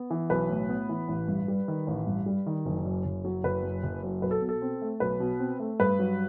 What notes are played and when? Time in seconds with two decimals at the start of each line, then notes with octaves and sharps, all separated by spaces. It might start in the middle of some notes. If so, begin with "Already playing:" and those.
Already playing: B3
0.10 E3
0.30 B1 B4
0.50 A2
0.69 B3
0.89 E3
1.08 A1
1.28 G2
1.48 G3
1.68 D#3
1.87 A1
2.07 G2
2.26 G3
2.46 D#3
2.66 F#1
2.85 F#2
3.05 F#1
3.25 F#3
3.44 F#1 B4
3.63 F#2
3.83 F#1
4.03 F#3
4.22 B1 B4
4.31 A4
4.41 B2
4.49 A4
4.62 C4
4.82 A3
5.00 B1 B4
5.20 B2
5.39 C4
5.60 A3
5.80 G2 B4
5.99 F#3